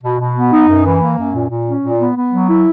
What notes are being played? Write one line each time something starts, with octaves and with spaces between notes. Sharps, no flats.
B2
B2
B3
D#4
F#2
E3
A#3
F#2
A#2
A#2
C#4
A#2
B3
B3
F#3
E4